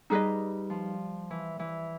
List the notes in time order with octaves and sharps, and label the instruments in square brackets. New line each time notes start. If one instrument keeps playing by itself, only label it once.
[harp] G3 [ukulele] D#4 G#4 B4 D#5
[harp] F3
E3
E3